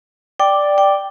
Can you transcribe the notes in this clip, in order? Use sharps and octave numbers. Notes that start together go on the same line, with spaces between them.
D5 G5
G5